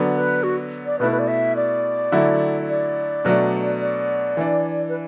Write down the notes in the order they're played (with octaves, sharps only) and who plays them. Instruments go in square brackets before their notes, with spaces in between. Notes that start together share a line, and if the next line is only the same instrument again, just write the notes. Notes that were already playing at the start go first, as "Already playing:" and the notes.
Already playing: [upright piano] D3 F#3 B3 D4
[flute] B4
F#4
D5
[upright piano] B2 A3 E4 [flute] B4
[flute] B4
D5
E5
D5
[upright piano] D3 F#3 A3 E4
[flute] D5
[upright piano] B2 F#3 A3 D4
[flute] D5
[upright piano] E3 D4
[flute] B4